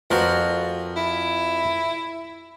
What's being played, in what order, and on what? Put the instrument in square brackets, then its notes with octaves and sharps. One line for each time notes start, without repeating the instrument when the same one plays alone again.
[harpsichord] F2 A#4 B4 [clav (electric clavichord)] F3 F#4
[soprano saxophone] E4